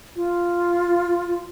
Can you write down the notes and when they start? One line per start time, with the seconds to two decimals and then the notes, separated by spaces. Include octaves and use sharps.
0.16 F4